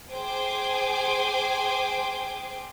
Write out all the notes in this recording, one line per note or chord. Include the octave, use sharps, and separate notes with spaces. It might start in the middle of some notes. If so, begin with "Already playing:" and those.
G#4 C5 G5 G#5 D6